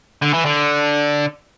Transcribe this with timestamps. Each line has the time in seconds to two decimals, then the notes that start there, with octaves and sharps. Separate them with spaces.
0.22 D3
0.34 E3
0.45 D3